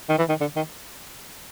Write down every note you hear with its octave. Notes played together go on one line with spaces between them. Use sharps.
D#3
E3
D#3
D3
D#3